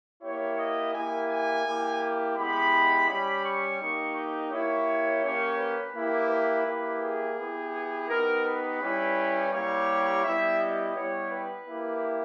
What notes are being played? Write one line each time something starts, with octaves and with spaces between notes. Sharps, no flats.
A#3 E4 G4 C#5
D#5
A#3 E4 G4 G#5
G#5
A#3 E4 G4
G#3 B3 E4 G4 B5
G3 C#4 G4 B5
C#6
A#3 D#4 G4
D#5
A#3 E4 G4 C#5
A#3 C#4 G4 C#5
B4
A#3 E4 G4
B4
A#3 E4 G4
G#4
B3 E4 G4
B3 D#4 G4 A#4
B4
G3 C#4 E4 G4
G3 A#3 E4 G4 C#5
G3 B3 E4 G4 E5
D#5
G3 B3 E4 G4 C#5
B4
A#3 E4 G4